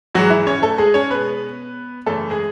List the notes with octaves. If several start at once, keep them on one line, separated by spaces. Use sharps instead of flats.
G#2 E3 F#3 G#3 F#4
E4
C#4 C#5
A3 A4
G#3 G#4
C#4 C#5
B2 G#3 B3 B4
F#2 C#3 E3 A3 A4
G#3 G#4